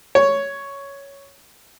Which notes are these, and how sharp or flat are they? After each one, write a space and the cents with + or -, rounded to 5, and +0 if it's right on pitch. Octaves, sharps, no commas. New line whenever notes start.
C#5 +5